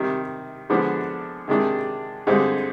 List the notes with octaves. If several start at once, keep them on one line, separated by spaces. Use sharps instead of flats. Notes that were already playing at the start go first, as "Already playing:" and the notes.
Already playing: C3 D#3 G3
D3 F3 G#3 B3 D4
C3 D#3 G#3 D4
G2 D3 G#3 C4 D#4